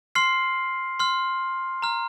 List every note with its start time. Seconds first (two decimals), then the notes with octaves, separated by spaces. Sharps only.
0.15 C6 F6 C7
0.99 C6 F6
1.82 A#5 F6